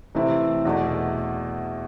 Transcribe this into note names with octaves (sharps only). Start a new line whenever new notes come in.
C3 E3 A3 C4 E4
E2 B2 A3